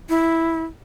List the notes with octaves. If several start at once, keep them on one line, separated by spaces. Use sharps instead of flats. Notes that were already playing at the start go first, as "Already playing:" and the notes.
E4